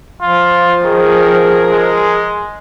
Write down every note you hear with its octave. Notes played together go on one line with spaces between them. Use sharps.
F3 F4
D#3 G#4 A#4
G#3